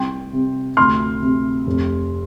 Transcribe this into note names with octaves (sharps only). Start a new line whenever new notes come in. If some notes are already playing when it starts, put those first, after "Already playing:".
Already playing: C2 G5 C6
C3
D2 C6 F6
C3
F1